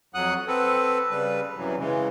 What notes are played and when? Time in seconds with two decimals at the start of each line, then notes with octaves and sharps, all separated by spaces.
0.14 F2 F#3 F#5 D#6 F#6
0.47 C4 A4 B4
1.11 C#3 G3 B4
1.56 F#2 C3 E3 F#3
1.79 C#3 E3 G#3